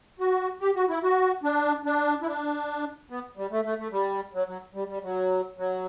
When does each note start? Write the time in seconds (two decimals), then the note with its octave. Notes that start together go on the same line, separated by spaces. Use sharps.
0.19 F#4
0.61 G4
0.75 F#4
0.89 E4
1.03 F#4
1.43 D4
1.85 D4
2.22 E4
2.27 D4
3.10 B3
3.37 G3
3.51 A3
3.65 A3
3.78 A3
3.92 G3
4.34 F#3
4.48 F#3
4.74 G3
4.89 G3
5.03 F#3
5.58 F#3